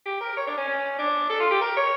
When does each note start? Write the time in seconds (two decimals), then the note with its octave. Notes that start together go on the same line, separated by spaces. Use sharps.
0.05 G4
0.21 A#4
0.37 C#5
0.47 D4
0.57 C#4
0.67 C#4
0.99 D4
1.30 A4
1.40 F4
1.51 G4
1.61 A#4
1.77 C#5